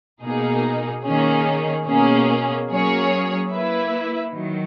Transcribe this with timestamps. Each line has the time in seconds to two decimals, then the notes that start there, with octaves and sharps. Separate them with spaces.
0.23 B2 A#3 D#4 G#4
1.04 D#3 A#3 C#4 G#4
1.87 B2 A#3 C#4 G#4
2.69 F#3 A#3 C#4 G#4 C#5
3.52 A#3 E4 B4 E5
4.34 D#3 F#3